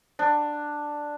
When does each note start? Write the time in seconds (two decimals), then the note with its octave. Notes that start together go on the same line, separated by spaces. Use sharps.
0.19 D4